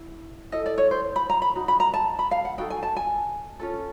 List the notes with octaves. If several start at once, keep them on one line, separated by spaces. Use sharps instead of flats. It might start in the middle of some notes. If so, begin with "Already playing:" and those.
Already playing: E4
E4 A4 D#5
D5
C#5
C5
B5
A#5
B5
D#4 F#4
B5
A#5
A5
B5
F5
F#5
D#4 F#4 A4 G5
G#5
A5
G#5
C#4 F4 A4